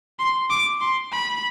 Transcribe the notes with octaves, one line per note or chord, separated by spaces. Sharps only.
C6
D6
C6
B5